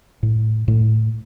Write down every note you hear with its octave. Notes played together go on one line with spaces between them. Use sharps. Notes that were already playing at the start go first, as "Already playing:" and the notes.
A2
A2